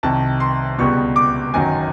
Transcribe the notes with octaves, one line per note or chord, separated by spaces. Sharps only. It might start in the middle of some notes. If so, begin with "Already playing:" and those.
C2 C3 D#3 A5
C6
C#2 B2 G3 B3 C#6
D6
G1 F#2 D#3 F#3 G#5